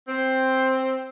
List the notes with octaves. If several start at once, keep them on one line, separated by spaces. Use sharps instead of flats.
C4